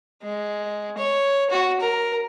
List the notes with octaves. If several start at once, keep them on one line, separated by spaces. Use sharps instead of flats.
G#3
C#5
F#4
A#4